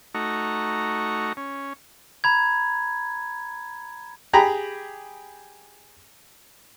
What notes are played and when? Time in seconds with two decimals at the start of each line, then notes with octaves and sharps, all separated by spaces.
0.14 A3 D#4 F#4 A#5 C#6
1.37 C#4
2.24 A#5 B5 G#6
4.33 G4 G#4 A#5 B5